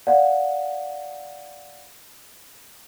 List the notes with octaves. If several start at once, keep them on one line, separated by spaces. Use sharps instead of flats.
D5 F5 F#5